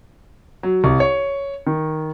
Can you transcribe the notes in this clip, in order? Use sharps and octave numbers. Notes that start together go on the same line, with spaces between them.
F#3
C2
C#5
D#3